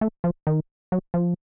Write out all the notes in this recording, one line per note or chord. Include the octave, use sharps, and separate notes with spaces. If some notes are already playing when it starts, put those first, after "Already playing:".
A3
F3
D#3
F#3
F3